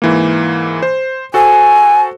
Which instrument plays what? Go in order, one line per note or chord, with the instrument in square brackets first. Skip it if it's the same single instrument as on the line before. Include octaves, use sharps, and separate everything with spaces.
[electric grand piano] G#2 E3 A#3
C5
[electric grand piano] F#4 A4 C5 [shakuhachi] G#5